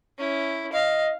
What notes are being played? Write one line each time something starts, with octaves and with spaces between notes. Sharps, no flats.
C#4 E4
D#5 F5